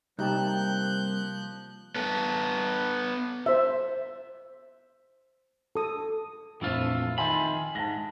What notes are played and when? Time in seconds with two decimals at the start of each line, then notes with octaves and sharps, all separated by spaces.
0.19 C2 F3 A#3 D#4 G4 A5 F#6 G6
1.96 B3 A4
3.46 C5 E5
5.75 A4 D#6
6.61 A#1 F2 E3 A3 F4
7.18 D#3 E5 G#5 B5 C6
7.75 G#2 A5 A#6